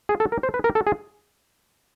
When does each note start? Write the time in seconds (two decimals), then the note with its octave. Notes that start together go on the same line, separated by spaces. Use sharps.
0.09 G#4
0.20 A4
0.32 A#4
0.43 C5
0.54 B4
0.64 A#4
0.75 A4
0.87 G#4